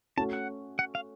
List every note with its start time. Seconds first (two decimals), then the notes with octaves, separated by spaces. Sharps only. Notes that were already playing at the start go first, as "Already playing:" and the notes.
0.17 A3 C#4 F#4 A5
0.33 F#5
0.79 F#5
0.95 F5